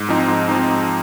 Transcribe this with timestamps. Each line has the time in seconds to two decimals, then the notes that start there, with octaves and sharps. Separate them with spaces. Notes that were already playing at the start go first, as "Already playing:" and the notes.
Already playing: G#2
0.09 F3 C4 D#4
0.28 G#2
0.49 F3 C4 D#4
0.70 G#2